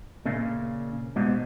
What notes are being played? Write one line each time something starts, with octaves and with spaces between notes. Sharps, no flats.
A#2 C#3
G#2 B2